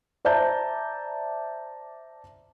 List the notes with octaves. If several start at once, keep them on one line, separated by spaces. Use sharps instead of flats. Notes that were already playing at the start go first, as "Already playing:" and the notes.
C5 D5 E5 A5 A#5 G6